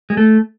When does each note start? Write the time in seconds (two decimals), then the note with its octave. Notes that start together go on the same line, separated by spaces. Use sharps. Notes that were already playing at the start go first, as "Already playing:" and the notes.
0.10 G#3
0.17 A3